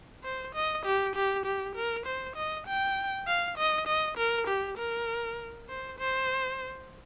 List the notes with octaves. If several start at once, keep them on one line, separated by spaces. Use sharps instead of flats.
C5
D#5
G4
G4
G4
A#4
C5
D#5
G5
F5
D#5
D#5
A#4
G4
A#4
C5
C5